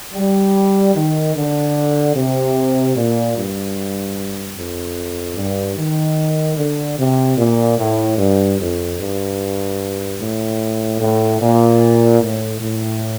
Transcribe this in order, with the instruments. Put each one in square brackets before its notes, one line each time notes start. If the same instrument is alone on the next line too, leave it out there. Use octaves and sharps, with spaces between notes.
[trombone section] G3
D#3
D3
C3
A#2
G2
F2
G2
D#3
D3
C3
A#2
A2
G2
F2
G2
A2
A2
A#2
A2
A2